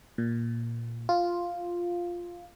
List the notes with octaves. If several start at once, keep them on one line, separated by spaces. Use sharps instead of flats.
A#2
F4